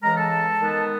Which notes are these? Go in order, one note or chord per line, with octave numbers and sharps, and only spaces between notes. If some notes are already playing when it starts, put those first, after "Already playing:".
C#3 E3 G#3 A#4 A#5
A4 A5
D#3 G#3 B3